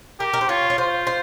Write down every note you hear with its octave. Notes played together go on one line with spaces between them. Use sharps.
G4 A#4
A#4
C5
F4 C#5
C#5
F4 C5
C5